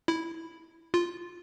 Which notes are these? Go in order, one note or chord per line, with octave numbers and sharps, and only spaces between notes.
E4
F4